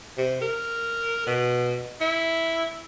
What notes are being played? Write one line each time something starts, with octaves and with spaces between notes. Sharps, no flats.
C3
A#4
B2
E4